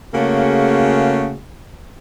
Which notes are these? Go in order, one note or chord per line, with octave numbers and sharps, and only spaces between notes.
C#3 A3 A#3 C#4 F#4 G#4